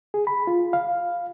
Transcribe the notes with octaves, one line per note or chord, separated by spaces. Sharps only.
G#4
B5
F4
F5